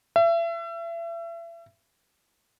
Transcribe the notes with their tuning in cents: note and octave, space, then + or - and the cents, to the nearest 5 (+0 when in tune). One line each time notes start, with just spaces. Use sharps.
E5 +35